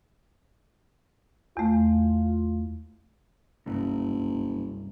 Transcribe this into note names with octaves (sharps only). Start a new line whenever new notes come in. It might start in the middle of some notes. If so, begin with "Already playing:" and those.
E2 A3 F4
F#1 C2 G2